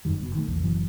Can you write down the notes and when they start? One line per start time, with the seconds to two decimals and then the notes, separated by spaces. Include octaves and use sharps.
0.05 G1 F#2 D#3 G3
0.22 F#1 B2
0.35 D#3 E3 A3
0.48 B1 E2 B2 A#3
0.62 F#1 F#2 E3 F#3